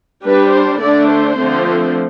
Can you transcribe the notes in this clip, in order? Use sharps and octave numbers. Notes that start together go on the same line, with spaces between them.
G3 D4 B4
C5
D3 A3 D4 D5
C5
D3 F3 A3 C4